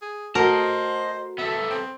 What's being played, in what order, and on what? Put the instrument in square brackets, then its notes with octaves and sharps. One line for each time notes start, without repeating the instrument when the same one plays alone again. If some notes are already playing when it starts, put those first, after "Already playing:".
[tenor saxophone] G#4
[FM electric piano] A3 F#4 [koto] A#4 [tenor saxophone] C5 [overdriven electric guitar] D#5 A5
[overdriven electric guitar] B3 A4 [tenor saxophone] E5
[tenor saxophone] C4